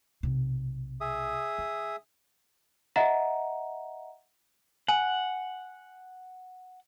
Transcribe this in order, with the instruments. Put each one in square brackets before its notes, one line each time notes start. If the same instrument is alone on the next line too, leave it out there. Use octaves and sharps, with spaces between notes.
[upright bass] B1 C3
[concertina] G#4 E5 D#6
[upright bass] D3
[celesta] D#5 E5 F#5 A#5
[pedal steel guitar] F#5 [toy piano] G#5